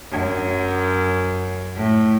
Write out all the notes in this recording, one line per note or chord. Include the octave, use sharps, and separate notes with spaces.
F#2
A2